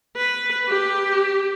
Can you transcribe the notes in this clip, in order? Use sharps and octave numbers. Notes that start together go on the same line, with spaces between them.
B4
G4